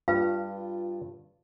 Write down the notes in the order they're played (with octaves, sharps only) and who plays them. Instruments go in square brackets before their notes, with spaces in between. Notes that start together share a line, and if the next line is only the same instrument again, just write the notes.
[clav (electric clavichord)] G2 [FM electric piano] F4 [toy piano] B4 F5